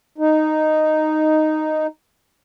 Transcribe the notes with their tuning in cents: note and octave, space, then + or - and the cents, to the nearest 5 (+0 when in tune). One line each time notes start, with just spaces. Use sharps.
D#4 -5